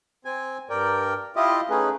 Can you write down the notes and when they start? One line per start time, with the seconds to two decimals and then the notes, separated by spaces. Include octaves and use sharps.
0.25 C4 G#5
0.70 G2 A#4 D5 G5
1.36 E4 F4 G4 D#5
1.70 A3 C#4 D#4 G#4 B4